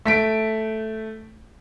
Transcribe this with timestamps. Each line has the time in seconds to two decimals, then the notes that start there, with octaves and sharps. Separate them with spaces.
0.05 A3 B6 D7